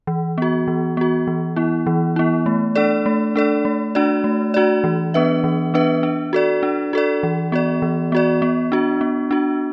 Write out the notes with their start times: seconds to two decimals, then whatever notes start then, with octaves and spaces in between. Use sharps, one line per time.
0.07 E3
0.38 B3 F#4
0.68 E3
0.97 B3 F#4
1.27 E3
1.56 B3 E4
1.87 E3
2.16 B3 E4
2.46 A3
2.75 D4 A4 D5
3.06 A3
3.36 D4 A4 D5
3.65 A3
3.95 D4 F#4 D5
4.24 A3
4.54 D4 F#4 D5
4.84 E3
5.14 B3 D4 B4 E5
5.44 E3
5.74 B3 D4 B4 E5
6.03 D4
6.33 F#4 A4 D5
6.63 D4
6.93 F#4 A4 D5
7.23 E3
7.52 B3 F#4 D5
7.82 E3
8.12 B3 F#4 D5
8.42 B3
8.72 D4 F#4
9.01 B3
9.31 D4 F#4